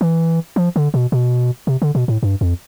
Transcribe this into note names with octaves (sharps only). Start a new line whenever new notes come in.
E3
F3
D3
B2
B2
C3
D3
B2
A2
G2
F2